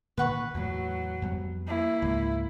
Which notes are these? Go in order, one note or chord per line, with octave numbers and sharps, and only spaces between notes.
A#2 D3 D#3 B4 F#5 C#6
E2 A2 F#3
F2 G3 B3
A#3 E4
C#2 G#2